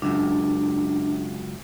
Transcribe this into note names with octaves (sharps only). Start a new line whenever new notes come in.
C#2 F#2 D4